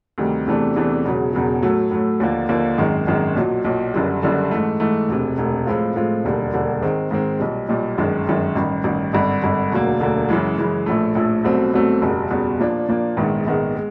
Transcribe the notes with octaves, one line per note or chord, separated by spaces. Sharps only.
D2 C3 D#3 G3
E2 C3 E3 A3 D4
E2 C3 E3 A3 D4
E1 E2 C#3 F#3
E1 E2 C#3 F#3
A2 F#3 A3
A2 F#3 A3
D#2 D3 F3 A#3
D#2 D3 F3 A#3
G#1 F#2 D#3 G#3
G#1 F#2 D#3 G#3
B1 A#2 F#3
B1 A#2 F#3
F#1 F#2 D3 G3
F#1 F#2 D3 G3
G#2 E3 A3
G#2 E3 A3
E1 D2 C3
E1 D2 C3
A2 F3 G#3 C4 F4
A2 F3 G#3 C4 F4
E1 D#2 D3 G3
E1 D#2 D3 G3
G#2 D#3 G#3 C4
G#2 D#3 G#3 C4
B1 A#2 G3
B1 A#2 G3
G1 F#2 D#3 G#3
G1 F#2 D#3 G#3
A1 G2 D#3
A1 G2 D#3
G#1 G2 D3
G#1 G2 D3
E1 D2 D3 F#3 A#3
E1 D2 D3 F#3 A#3
F#2 C#3 E3 G#3
F#2 C#3 E3 G#3
A#1 A2 F3 A3
A#1 A2 F3 A3
C2 B2 F#3 A3 C4
C2 B2 F#3 A3 C4
F#1 E2 B2 G3
F#1 E2 B2 G3
A#2 F3 A#3 D4
A#2 F3 A#3 D4
A#1 G#2 D#3 G#3 B3
A#1 G#2 D#3 G#3 B3
G#3